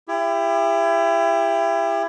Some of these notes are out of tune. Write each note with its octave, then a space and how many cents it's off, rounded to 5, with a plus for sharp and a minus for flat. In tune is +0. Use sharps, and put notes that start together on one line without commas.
E4 +25 G4 +30